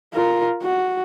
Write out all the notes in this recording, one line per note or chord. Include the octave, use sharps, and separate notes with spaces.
F4 A#4
F#4